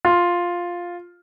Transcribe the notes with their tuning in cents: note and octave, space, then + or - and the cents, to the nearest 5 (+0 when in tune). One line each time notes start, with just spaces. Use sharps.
F4 +5